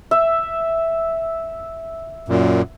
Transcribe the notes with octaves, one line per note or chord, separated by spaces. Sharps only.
E5
F#2 A#2